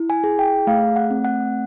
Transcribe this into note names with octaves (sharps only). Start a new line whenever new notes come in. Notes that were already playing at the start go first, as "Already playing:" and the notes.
Already playing: E4
G#5
G#4
G5
A3 F5
F#5
C4
F#5